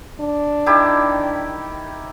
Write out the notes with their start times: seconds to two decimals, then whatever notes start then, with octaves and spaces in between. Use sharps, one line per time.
0.21 D4
0.66 D#3 E4 G4